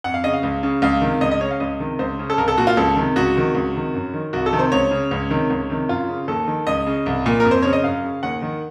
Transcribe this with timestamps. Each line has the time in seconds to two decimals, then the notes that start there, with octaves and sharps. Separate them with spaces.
0.04 F2 F#5
0.14 F5
0.24 C#3 D#5
0.33 F5
0.43 C#2
0.63 C#3
0.82 C#2 F5
1.01 C3 D#3
1.21 C#2 D#5
1.31 D#5
1.41 C#3 C#5
1.51 F5
1.60 C#2 D#5
1.80 C3 D#3
1.99 C#2 C5
2.19 C#3
2.30 A4
2.38 C2 A#4
2.48 A4
2.58 A#2 F#4
2.67 F4
2.77 C#2 A4
2.97 C3 D#3
3.16 C#2 F#4
3.36 C3 D#3
3.55 C#2
3.75 C3 D#3
3.94 F#2
4.14 D#3
4.33 C2 F#4
4.46 A4
4.53 C3 D#3
4.59 C5
4.72 C#2 C#5
4.91 C#3
5.11 C#2
5.30 C3 D#3
5.50 C#2
5.70 C3 D#3
5.89 F#2 F4
6.09 C#3
6.28 D#2 A4
6.48 D#3
6.67 C#2 D#5
6.87 C#3
7.06 C2
7.26 A#2
7.40 A#4
7.45 F2
7.51 C5
7.63 C#3 C#5
7.73 D#5
7.84 F#2 F5
8.04 C#3
8.23 D#2 F#5
8.42 D#3